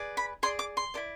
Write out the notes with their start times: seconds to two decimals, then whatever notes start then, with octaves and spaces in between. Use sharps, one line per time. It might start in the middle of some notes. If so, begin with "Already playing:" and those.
Already playing: G#4 B4 D5
0.17 B5
0.43 G#4 D5 C6
0.59 D6
0.77 C6
0.94 E4 A4 D5